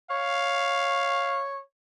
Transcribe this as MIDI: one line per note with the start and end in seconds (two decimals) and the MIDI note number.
0.11 1.60 73
0.11 1.45 77